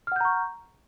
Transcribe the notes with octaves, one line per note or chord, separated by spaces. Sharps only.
F#5 A#5 C#6 F6 G6